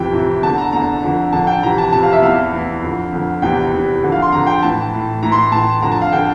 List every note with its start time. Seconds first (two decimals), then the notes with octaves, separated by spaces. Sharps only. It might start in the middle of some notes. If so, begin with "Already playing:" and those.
Already playing: F2 C3 E3 G5
0.13 F2 C3 E3
0.42 E2 D3 A5
0.58 A#5
0.72 E2 D3 A#5
1.03 F2 D3
1.32 F2 D3 A5
1.47 G5
1.62 F2 C3 E3 A#5
1.78 A5
1.92 F2 C3 E3 A5
2.03 F5
2.13 E5
2.22 E2 E3 F5
2.53 E2 E3
2.82 F2 D3
3.12 F2 D3
3.42 E2 C3 E3 G5
3.72 E2 C3 E3
4.03 F2 D3
4.12 F5
4.22 C6
4.32 F2 D3 A#5
4.47 G5
4.63 A2 E3 A5
4.92 A2 E3
5.23 A2 E3 A#5
5.32 C6
5.52 A2 E3 A5
5.82 F2 D3 A#5
5.92 A5
6.02 F5
6.12 D3 G5